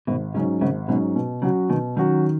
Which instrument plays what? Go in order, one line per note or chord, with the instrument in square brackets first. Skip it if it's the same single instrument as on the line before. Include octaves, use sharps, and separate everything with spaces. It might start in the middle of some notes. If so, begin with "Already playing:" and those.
[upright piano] G#1 [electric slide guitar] B2
[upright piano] G#2 F#3 C#4 [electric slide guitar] C#3
[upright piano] G#1 [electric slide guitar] C#3
[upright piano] G#2 F#3 C#4 [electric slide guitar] B2
[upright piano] B2
[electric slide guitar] C#3 [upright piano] F#3 C#4 F#4
[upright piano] B2 [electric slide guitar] D#3
[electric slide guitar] D#3 [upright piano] F#3 C#4 F#4